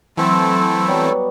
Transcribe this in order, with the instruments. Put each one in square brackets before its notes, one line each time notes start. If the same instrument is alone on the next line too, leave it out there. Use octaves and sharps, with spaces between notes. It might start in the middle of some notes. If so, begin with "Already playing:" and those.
[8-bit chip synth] E3 C4 [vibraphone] F#3 C6 E6 [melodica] A3 E4 A4
[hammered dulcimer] F#3 G3 B3 [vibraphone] C#5